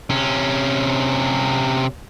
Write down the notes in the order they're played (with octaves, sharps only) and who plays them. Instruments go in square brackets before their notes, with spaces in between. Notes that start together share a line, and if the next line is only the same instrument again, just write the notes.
[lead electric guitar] C3 C#4